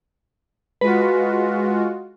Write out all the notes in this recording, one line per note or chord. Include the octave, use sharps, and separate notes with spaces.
G#3 F4 F#4 B4